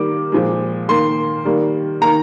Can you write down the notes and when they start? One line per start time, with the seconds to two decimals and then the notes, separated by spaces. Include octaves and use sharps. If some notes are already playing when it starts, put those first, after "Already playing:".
Already playing: D#3 G3 A#3 D6
0.32 A#2 F3 G#3
0.89 D#3 A#3 C6
1.45 D#3 G3 A#3
2.01 D#3 A#3 A#5